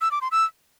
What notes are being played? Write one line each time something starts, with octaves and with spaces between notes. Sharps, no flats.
E6
D6
C6
E6